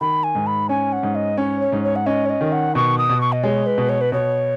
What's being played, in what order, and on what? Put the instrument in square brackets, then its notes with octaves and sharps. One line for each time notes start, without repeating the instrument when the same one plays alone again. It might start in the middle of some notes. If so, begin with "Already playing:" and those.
[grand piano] D#3 [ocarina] B5
[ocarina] G#5
[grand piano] G#2
[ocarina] B5
[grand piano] C#4 [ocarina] G#5
[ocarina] F#5
[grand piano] G#2
[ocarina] D#5
[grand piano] C#4 [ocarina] C#5
[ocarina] C#5
[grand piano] G#2
[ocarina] C#5
F#5
[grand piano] C#4 [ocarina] D#5
[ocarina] C#5
D#5
[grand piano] D#3
[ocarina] F#5
[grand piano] B2 [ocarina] C#6
[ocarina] D#6
[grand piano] B2
[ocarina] C#6
D#5
[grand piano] G#3 [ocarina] C#5
[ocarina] B4
[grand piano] B2
[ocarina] C#5
B4
[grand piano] B2 [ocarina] C#5